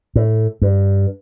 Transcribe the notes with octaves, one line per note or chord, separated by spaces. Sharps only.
A2
G2